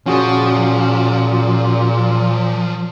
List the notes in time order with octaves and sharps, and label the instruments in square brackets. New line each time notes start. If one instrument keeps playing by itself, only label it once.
[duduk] A#2 [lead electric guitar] F3 [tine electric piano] C#4 F#4 G#4